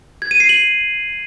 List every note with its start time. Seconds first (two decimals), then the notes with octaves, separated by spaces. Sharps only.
0.22 G#6
0.31 D#7
0.40 C7
0.49 F#7